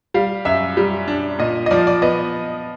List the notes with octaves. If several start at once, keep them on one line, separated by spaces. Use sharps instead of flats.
G3 F5
F#2 E5
G3
D4
A#2 D#5
D#5
F3 D5
D5
B3 D#5